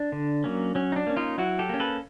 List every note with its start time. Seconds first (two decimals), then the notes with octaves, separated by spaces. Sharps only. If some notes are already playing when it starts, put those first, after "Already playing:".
Already playing: D4
0.12 D3
0.44 F#3 A#3 C#4
0.75 F#3 C#4
0.92 D#4
0.96 D4
1.07 A#3 C#4
1.17 D#4 F4
1.38 F#3 E4 F#4
1.59 G4 A4
1.69 A#3 C#4
1.80 A4 B4